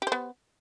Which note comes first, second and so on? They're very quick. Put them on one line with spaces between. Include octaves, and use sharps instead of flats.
G4 C5 B3